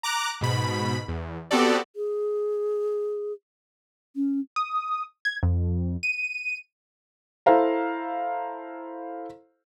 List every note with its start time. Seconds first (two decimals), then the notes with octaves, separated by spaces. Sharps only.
0.03 A#5 D6 F#6
0.41 G#2 B2 B5
1.08 E2
1.51 B3 C4 F#4 G4 A4 D5
1.96 G#4
4.16 C#4
4.56 D#6
5.25 G#6
5.43 F2
6.03 D#7
7.46 E4 A4 C5 F5 A#5